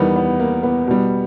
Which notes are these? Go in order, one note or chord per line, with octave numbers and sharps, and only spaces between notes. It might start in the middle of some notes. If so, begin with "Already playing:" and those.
Already playing: E2 D#3 G3 B3
B3
A#3
B3
B2 G3